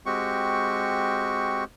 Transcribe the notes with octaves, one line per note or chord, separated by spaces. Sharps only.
G#3 C4 F#4 G4 C#6